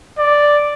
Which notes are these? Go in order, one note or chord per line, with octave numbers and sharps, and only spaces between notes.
D5